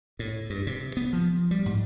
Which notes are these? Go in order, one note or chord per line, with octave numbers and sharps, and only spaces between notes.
A2
G2
C3
B3
F3
G3
G#2